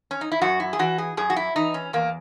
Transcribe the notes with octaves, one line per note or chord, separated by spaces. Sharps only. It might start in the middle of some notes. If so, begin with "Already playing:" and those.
C#4
D#4
E4
F#2 F#4
E4
G#4
E3 F#4
G#4
F#2 G#4
F#4
E4
E3 D#4
C#4
E2 A#3